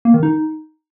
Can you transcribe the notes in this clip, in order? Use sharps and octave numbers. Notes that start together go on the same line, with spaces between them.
A#3
D#3
D#4